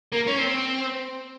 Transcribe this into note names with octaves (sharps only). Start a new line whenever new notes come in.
A#3
C#4
C4